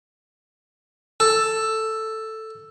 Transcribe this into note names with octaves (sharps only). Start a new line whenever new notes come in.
A4